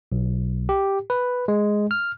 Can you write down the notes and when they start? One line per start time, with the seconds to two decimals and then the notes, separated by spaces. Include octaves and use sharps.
0.12 B1
0.69 G4
1.10 B4
1.48 G#3
1.91 F6